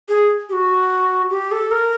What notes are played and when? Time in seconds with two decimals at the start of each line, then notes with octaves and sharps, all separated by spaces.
0.09 G#4
0.49 G4
0.53 F#4
1.30 G4
1.51 A4
1.71 A#4